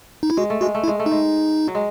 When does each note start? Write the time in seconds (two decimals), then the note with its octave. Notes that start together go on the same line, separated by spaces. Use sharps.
0.23 D#4
0.30 E4
0.37 G#3 F#4
0.50 A3
0.61 G#3 F#4
0.75 A3
0.84 E4
0.88 G#3
0.99 A3
1.06 D#4
1.12 G#3
1.68 F#3
1.75 G#3